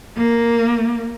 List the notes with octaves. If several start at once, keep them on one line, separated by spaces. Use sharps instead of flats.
A#3